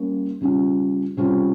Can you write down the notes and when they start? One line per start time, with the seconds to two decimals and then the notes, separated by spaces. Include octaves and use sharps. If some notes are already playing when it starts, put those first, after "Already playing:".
Already playing: G3 A#3 C#4
0.41 C#3 G3 C#4 F4
1.17 C3 G3 C#4 F4